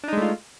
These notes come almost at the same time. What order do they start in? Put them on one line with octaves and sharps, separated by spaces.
D4 D#4 G#3 A3 F4